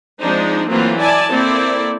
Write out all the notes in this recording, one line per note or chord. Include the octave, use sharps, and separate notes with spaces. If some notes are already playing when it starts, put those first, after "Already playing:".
F3 G#3 C4 D4 D#4 C5
E3 F#3 A3 A#3 C4 F4
E4 D5 G#5 A5
A#3 C4 E4 A4 D5